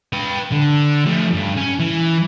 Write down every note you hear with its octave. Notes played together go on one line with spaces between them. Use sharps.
B4 G5
D3
F3 A3
G2
C#4
E3